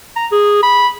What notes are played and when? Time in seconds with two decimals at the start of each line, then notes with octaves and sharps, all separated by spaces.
0.16 A#5
0.31 G#4
0.63 B5